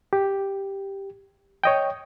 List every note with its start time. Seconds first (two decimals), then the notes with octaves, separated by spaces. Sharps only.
0.13 G4
1.64 C#5 D#5 G5